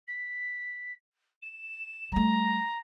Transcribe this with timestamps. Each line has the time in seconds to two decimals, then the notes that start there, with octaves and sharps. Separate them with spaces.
0.07 B6
1.42 E7
2.12 G3 A3 A#5